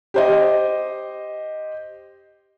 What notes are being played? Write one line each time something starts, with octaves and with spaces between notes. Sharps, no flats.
G4 C5 D#5